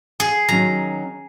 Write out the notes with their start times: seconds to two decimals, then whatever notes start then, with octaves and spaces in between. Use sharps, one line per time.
0.20 G#4
0.49 D#3 F#3 C#4 A#5